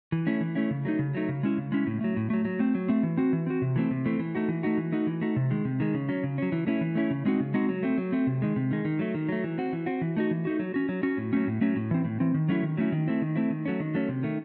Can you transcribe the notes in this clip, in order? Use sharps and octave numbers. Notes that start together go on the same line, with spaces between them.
E3
A3 C#4 E4
E3
A3 C#4 E4
C#3
F#3 A3 D#4
C#3
F#3 A3 D#4
C#3
G#3 C#4 E4
C#3
G#3 C#4 E4
A2
F#3 A3
A2
F#3 A3
F#3
A3 C4
F#3
A3 C4
E3
C4 F#4
E3
C4 F#4
C3
E3 A3 C4
C3
E3 A3 C4
E3
A3 D#4 F#4
E3
A3 D#4 F#4
E3
A3 D#4 F#4
E3
A3 D#4 F#4
C3
D#3 G#3
C3
D#3 G#3
C#3
F#3 C#4
C#3
F#3 C#4
E3
A3 C#4 E4
E3
A3 C#4 E4
C#3
G#3 C4 D#4 F#4
C#3
G#3 C4 D#4 F#4
F#3
A3 C4
F#3
A3 C4
C3
D#3 G#3
C3
D#3 G#3
D#3
F#3 A3
D#3
F#3 A3
E3
C4 F#4
E3
C4 F#4
E3
A3 D#4 F#4
E3
A3 D#4 F#4
F#3
C#4 F#4
F#3
C#4 F#4
A2
F#3 A3 C#4
A2
F#3 A3 C#4
A2
E3 C4
A2
E3 C4
D#3
F#3 A3 C#4 E4
D#3
F#3 A3 C#4 E4
D#3
A3 C4 E4
D#3
A3 C4 E4
D#3
F#3 A3 C#4
D#3
F#3 A3 C#4
C3
D#3 A3